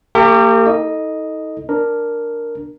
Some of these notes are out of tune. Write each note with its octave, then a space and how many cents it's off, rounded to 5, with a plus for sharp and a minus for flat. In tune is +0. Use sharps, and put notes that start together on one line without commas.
A#3 -40 G4 +15 A#4 -35
D#4 +35 A4 +0 D#5 +0
D4 +0 A#4 +0